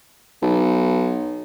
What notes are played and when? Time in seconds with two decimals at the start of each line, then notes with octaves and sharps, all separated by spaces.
0.42 B1